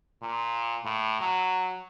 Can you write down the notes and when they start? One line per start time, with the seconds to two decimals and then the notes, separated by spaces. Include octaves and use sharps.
0.22 A#2
0.85 A2
1.21 F#3